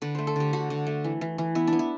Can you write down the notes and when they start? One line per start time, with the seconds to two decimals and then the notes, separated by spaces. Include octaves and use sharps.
0.02 D3 B4
0.15 A3 C5
0.27 A4
0.36 D3 G4
0.53 D3 F#4
0.70 D3
0.87 A3
1.04 E3
1.21 E3
1.38 E3
1.55 B3 E4
1.67 D4
1.73 B3
1.79 E4